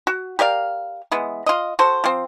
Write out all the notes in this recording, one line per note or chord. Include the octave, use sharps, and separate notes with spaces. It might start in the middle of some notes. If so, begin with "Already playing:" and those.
F#4
G4 A#4 D5 F5
E3 G#3 B3
F4 D#5
F#4 A4 C5
F3 C4